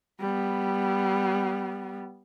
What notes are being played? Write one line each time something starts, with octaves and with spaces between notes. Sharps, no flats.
G3 B3